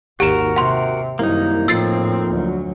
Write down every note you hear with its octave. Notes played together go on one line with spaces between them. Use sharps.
G#1 D#2 F#4 G4 A#4 E7
C3 F#5 C6
C2 F#2 D#3 A#3 D#4
F2 A2 C4 E6 A6 C7
D2 F#3